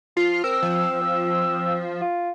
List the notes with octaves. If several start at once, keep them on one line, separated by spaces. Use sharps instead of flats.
F3 F4 C7
C4 A#4 E6
F3
C4
F4